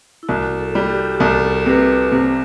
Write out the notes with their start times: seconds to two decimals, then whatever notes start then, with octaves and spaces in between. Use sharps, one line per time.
0.23 E4
0.28 C2 F#4
0.59 A4
0.75 G3
0.90 G4
1.14 G4
1.20 C2 A4
1.66 C3 B4
2.12 C3 C5